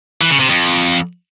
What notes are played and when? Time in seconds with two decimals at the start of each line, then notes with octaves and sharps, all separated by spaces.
0.21 E3
0.31 C#3
0.40 C3
0.49 F2